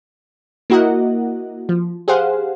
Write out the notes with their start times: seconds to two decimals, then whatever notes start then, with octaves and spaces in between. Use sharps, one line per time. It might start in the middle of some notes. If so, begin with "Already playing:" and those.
0.70 A#3 E4 F#4 A#4 D#5 F#5
1.69 F3
2.08 G4 G#4 C5 F5 F#5